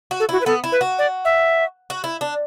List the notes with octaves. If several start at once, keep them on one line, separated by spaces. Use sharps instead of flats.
F#4
A4
E4 F#4
B4
B3 A4
E4
B4
F#4
D5
E5
F#4
E4
D4